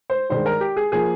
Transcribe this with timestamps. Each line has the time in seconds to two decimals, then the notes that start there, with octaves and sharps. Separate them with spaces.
0.10 C5
0.30 G2 D#3 G#3 C5
0.46 A#4
0.61 G4
0.77 G#4
0.92 F3 A#3 G#4